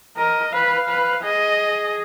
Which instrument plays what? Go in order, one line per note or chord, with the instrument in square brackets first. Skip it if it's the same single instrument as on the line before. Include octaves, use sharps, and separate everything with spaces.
[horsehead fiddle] A#4 [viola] D#5
[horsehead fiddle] B4 [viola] F5
[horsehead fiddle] B4
[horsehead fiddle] G#4 [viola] D#5